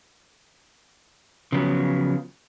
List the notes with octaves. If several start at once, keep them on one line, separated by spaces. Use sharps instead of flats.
C#3 F3 F#3 B3